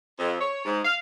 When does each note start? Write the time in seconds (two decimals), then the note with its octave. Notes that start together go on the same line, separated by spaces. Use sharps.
0.19 F2
0.40 C#5
0.65 G#2
0.84 F5